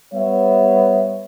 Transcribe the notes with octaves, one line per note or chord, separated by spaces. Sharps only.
G3 B3 C#5 E5